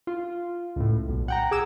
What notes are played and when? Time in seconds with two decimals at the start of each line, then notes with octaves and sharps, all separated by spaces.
0.07 F4
0.76 C#2 A2
1.09 B1
1.28 F#5 G5 A#5
1.51 G#4 D6 E6